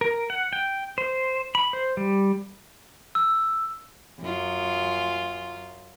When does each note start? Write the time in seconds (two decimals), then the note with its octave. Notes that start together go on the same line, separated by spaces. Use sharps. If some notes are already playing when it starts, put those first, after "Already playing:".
0.01 A#4
0.30 F#5
0.53 G5
0.98 C5
1.55 B5
1.73 C5
1.97 G3
3.15 E6
4.21 F#2 F4